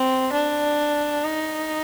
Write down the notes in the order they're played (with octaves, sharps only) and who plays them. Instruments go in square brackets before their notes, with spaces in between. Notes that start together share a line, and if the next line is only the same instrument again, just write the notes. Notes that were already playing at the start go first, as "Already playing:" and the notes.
Already playing: [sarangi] C4
D4
D#4